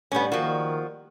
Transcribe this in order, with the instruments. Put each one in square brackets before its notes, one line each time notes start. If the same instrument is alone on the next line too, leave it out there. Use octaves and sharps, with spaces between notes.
[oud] A2 G3 [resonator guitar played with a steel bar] B3 C#4
[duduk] D#3 [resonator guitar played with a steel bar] F3 F#4 [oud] A#3